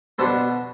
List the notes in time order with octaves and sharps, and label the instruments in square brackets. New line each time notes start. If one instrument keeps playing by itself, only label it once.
[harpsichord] B2 B3 D4 A4 C5